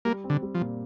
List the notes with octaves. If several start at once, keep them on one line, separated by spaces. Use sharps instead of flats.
G3 A#3
C4
D3
G3
F3
A#2